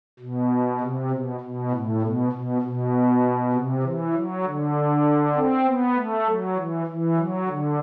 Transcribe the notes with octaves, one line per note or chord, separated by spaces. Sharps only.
B2
C3
B2
B2
A2
B2
B2
B2
C3
E3
F#3
D3
C4
B3
A3
F#3
E3
E3
F#3
D3